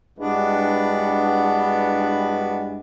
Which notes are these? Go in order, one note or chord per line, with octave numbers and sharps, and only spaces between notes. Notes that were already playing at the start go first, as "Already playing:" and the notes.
G2 E3 G#3 B3 D4 F#4